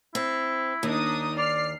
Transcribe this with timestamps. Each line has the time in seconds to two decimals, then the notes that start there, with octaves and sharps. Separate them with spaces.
0.15 C4 E4
0.83 D#2 D4 D#4 D#6
1.38 D5 F6 C7